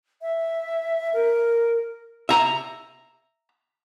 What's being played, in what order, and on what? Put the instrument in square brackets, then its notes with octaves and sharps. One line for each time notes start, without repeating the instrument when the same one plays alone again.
[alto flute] E5
A#4
[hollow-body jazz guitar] E5 A#5